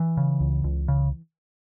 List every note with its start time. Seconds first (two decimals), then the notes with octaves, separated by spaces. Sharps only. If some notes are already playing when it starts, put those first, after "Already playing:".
Already playing: E3
0.17 C#3
0.40 C#2
0.64 C#2
0.88 C#3